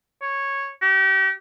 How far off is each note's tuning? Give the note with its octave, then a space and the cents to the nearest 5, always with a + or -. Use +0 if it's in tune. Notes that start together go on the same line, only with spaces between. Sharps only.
C#5 -5
G4 -40